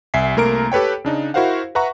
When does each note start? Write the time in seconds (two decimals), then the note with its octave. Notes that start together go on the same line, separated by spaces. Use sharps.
0.14 C2 E5 G#5 B6 C7
0.36 C2 A3 A#3 A#4 A#5 D7
0.72 G4 A4 B4 C#5 G5
1.05 C#3 D4 D#4
1.34 E4 F#4 A#4 C5 F5 F#5
1.75 B4 E5 F#5 A#5 C#6